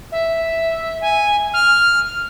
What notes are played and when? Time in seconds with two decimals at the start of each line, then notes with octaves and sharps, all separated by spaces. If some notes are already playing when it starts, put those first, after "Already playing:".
0.12 E5
1.01 G#5
1.54 F6